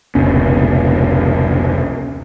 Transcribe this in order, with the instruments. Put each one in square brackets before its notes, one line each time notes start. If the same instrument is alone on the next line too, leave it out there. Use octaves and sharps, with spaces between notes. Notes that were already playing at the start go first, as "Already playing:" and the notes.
[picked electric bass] F1 C#2 B2 C#4